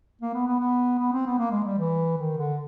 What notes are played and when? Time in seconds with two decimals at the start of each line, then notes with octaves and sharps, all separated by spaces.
0.21 A#3
0.34 B3
0.47 B3
0.60 B3
0.99 B3
1.13 C4
1.26 B3
1.38 A#3
1.52 G#3
1.65 G3
1.78 E3
2.18 D#3
2.37 D3